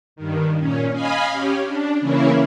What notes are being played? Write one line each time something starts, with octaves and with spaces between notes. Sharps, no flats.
G2 D#3
A#2 C#4
D#5 F5 G#5 B5
C#4 G4
D4
C#3 E3 A#3 C#4 E4